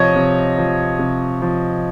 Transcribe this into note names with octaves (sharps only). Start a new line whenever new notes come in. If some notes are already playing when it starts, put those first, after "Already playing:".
Already playing: C3 F3 C#5 D#5
C3
F3
C3
F3